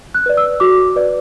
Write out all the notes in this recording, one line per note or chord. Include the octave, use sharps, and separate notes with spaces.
F#6
B4 D5
E6
F#4 D6
B4 D5